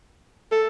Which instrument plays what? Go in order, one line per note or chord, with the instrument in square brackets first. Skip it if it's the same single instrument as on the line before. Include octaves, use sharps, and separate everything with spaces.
[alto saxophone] A4